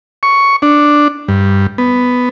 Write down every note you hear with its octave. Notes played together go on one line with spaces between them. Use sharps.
C#6
D4
G2
B3